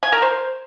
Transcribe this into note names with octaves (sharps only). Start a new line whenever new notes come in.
G#5
A#4
C5